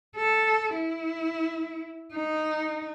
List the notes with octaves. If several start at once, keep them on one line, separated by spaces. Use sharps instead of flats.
A4
E4
D#4